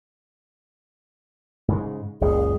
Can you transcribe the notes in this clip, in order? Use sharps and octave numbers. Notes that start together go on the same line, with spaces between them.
G#2 C#3 G#3
F#1 C#2 A#2 G#4